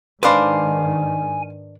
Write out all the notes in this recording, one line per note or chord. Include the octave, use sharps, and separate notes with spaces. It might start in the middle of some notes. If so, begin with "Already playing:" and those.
G#2 D#3 D4 B4 C5 F5 G#5 D6